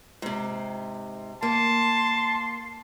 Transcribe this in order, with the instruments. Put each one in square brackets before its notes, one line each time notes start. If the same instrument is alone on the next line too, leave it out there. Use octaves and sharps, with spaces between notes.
[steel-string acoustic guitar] G#2 C3
[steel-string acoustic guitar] A#3 [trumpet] A5 [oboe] C6